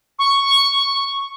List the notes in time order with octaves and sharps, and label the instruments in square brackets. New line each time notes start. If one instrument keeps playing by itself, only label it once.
[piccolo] C#6